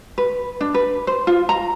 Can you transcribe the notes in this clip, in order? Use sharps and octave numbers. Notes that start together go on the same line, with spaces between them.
B4
D4
B4
C5
F4
A#5